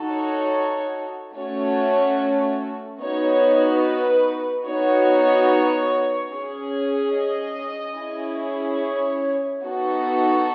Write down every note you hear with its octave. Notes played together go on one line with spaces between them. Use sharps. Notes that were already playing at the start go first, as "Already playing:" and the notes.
Already playing: D#4 F#4 A4
C#5
A3 C#4 F#4 A4 C#5
B3 D#4 F#4 C#5
B4
B3 D#4 F#4 C#5
C#4 G#4
D#5
C#4 E4 G#4
C#5
B3 D#4 F#4 A4